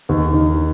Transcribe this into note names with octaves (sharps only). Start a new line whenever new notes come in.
D#2
D#3